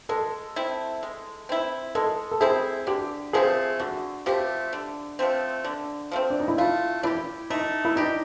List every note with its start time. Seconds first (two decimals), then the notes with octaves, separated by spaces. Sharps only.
0.09 G#3 A4
0.56 C4 E4
1.03 G#3
1.49 C4 E4
1.95 G#3 A4
2.31 A4
2.41 C4 E4 G#4
2.87 D3 G4
3.33 F3 A3 C4 G#4
3.79 D3 F#4
4.26 F3 A3 C4 G4
4.73 D3
5.19 F3 A3 C4
5.64 D3
6.12 F3 A3 C4
6.30 D4
6.40 D#4
6.48 E4
6.58 A3 F4
7.03 D4 E4 G4
7.50 A3 D#4
7.85 E4
7.96 D4 D#4 G4